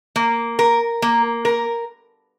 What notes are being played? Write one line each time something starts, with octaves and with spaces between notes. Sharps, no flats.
A#3
A#4
A#3
A#4